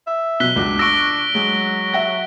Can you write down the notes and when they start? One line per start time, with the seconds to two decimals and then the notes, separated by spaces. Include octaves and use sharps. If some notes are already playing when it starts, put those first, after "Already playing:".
0.07 E5
0.40 B2 F#3 F#6 B6 G7
0.56 C#2 D4 F#4
0.79 C#6 E6 A#6 D7 G7
1.35 F#3 G#3
1.93 E5 F#5 A#6